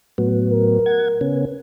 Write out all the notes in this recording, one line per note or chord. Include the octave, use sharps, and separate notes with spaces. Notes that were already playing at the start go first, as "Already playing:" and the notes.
A2 F#3 B3
A#4
F#5 G#6
C#3 B3 C#4